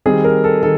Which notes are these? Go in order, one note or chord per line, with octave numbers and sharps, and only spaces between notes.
D#3 G3 C4 G#4
A#4
A4
D#3 A4